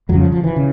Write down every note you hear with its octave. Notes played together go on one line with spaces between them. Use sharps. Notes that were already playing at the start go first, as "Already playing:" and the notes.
F2 C#3 F#3
F3
F3
E3
C#3